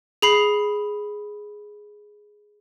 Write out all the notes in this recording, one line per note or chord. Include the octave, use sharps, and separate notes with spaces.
G#4 B5 C7